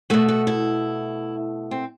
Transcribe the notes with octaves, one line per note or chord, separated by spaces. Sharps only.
B2 A3 F#4
F#4
E4
C4